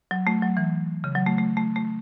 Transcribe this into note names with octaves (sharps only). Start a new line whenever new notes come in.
F#3
A3
F#3
E3
C#3
F#3
A3
A3
A3
A3